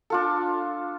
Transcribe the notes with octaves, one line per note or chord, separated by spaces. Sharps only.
D4 F4 A4